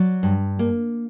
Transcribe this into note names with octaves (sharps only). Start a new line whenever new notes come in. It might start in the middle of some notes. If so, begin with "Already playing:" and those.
Already playing: F#3 D5
G2
A#3